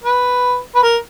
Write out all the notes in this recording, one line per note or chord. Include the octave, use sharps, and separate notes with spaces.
B4
B4
A#4